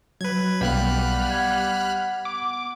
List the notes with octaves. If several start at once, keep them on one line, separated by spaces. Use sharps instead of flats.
F#3 B4 G#6
B1 G3 B3 F5 G5 B5 F6 F#6
F#5 G#6
D6